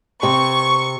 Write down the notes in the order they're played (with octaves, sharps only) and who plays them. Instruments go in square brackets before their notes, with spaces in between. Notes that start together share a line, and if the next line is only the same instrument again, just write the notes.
[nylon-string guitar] C3 [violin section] C#6